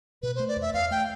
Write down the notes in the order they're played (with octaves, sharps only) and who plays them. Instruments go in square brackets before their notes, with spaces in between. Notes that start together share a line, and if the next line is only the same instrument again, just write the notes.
[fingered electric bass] B2 [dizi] B4
[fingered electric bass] A3 [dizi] C5
[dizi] D5
[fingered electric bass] E2
[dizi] E5
[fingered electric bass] E2 [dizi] F5
[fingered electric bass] A3 [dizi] G5